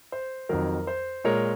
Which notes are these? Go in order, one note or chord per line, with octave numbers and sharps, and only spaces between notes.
C5
F2 D#3 F#3 A#4
C5
A#2 G#3 A#4 C#5